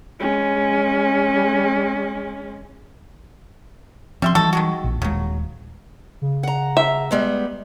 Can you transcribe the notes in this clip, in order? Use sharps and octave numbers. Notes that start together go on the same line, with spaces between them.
G#3 C#4
F3 G3 C4 C#4 E5 C6
E3 F#3 G3 D#4 F#4 A4
D#3 G#3 F#4
A#1
D#1 C#3 F#3 G#3
C#3
F#5 A#5
E5
G3 G#3 B3